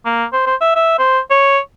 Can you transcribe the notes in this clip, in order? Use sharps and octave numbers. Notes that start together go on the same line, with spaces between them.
A#3
C5
C5
E5
E5
C5
C#5